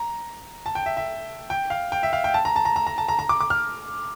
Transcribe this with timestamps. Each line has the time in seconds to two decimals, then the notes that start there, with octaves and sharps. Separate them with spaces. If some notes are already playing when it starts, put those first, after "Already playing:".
Already playing: A#5
0.66 A5
0.75 G5
0.86 E5
0.97 E5
1.50 G5
1.70 F5
1.92 G5
2.03 E5
2.13 F5
2.24 G5
2.34 A5
2.45 A#5
2.56 A5
2.65 A#5
2.76 A#5
2.87 A#5
2.98 A5
3.09 A#5
3.19 A#5
3.29 D6
3.41 D6
3.50 F6